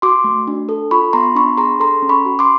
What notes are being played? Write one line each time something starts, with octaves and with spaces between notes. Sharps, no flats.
F#4 C6 D6
A3
D4
A4
F4 B5 C#6
B3 A#5 C6
D4 B5 C#6
G#4 A#5 C6
A4 A#5 C6
C#4
B5 C#6
F#4
C6 D6